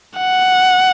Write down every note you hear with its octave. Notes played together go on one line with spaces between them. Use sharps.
F#5